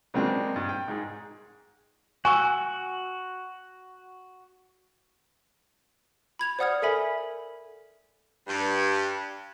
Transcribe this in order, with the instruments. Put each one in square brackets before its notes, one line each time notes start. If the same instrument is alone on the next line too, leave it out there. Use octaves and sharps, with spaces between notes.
[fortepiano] C#3 F#3 G#3 A#3 C4 D4
G2
G5
G#2 G#4
[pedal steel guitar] F#4 [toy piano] G#5 C#6 E6
[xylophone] B5 G#6 F7
C5 D5 F#5 D#6 F6 G#6
A4 A#4 E5 G#5 B5
[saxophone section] G2